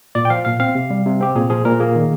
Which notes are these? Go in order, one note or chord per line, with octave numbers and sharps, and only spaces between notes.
A#2 D5
G5
F3 F5
A#2 F5
C4 F5
C3
G3
C3
C4 G4
A#2 G#4
F3 G#4
A#2 A#4
A#3 G#4
D#3